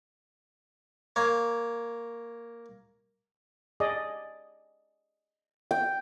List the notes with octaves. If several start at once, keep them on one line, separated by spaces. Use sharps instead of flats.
A#3 C#5
G#4 D5 D#5
G5